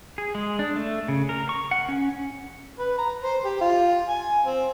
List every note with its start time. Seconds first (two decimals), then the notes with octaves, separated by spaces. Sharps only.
0.18 G#4
0.35 G#3
0.59 D4
0.76 A3
1.08 C#3
1.29 A#4
1.49 C#6
1.71 F#5
1.89 C#4
2.79 B4
2.98 A#5
3.24 C5
3.45 G4
3.61 F4
4.08 G#5
4.45 C4